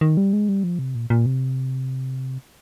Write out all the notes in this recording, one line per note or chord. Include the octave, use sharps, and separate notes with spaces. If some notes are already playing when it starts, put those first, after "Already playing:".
D#3
G3
G#3
G3
F3
C3
A#2
A#2
C3